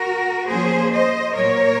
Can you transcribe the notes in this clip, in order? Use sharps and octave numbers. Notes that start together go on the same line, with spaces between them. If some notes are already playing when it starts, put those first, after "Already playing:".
Already playing: F#4 A#4
F3 A#3 C#4 G#4 C5
C5 D#5
A#2 F#3 A#3 A#4 C#5